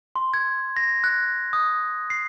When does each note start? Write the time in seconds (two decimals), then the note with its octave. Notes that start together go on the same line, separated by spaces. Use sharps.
0.16 C6
0.34 G#6
0.77 A#6
1.04 F#6
1.53 D#6
2.10 C7